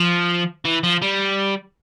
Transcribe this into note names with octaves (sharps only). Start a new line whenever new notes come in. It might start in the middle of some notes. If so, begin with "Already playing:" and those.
Already playing: F3
E3
F3
G3